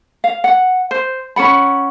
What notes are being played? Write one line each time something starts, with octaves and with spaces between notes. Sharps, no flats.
F5
F#5
C5
C#4 A4 F#5 B5